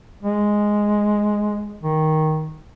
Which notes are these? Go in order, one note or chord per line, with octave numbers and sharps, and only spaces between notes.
G#3
D#3